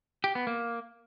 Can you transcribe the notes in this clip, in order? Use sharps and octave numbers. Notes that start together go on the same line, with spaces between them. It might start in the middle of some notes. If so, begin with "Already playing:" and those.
G4
B3
A#3